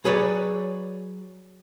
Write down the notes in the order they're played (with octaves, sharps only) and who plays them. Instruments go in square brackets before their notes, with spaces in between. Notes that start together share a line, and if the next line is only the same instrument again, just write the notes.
[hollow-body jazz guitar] F#3 G#4 B4 C#5 D5